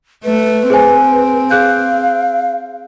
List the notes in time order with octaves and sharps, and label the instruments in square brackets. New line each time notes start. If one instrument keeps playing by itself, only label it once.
[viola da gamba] A3 [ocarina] B4
[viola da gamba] C4 [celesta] G#4 C5 G#5
[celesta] G#4 F#6 G6 [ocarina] F5